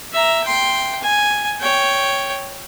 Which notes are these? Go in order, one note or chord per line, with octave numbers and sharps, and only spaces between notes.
E5 A#5
G5 C6
G#5
C#5 G5